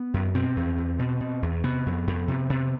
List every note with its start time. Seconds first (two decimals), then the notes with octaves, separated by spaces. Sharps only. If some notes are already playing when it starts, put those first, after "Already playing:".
Already playing: B3
0.14 F#2
0.34 B2 C4
0.56 E2
0.78 E2
0.99 B2
1.20 B2
1.42 E2
1.64 C3 B3
1.86 F2
2.07 F2
2.28 C3
2.50 C3